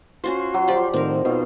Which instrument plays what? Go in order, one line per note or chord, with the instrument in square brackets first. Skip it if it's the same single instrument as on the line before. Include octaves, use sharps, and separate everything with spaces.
[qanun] C#4 F#4 C5 [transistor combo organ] F4 C6
[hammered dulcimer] F#3
[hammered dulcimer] F3 C5 [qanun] G4 D5
[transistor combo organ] A2 D#3 [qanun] C4 A#4
[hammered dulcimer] B2 [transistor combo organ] D#4 F4 C5